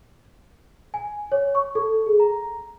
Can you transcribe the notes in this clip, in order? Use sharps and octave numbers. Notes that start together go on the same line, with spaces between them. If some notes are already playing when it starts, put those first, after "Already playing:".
G#5
C#5
C#6
A4
G#4
A#5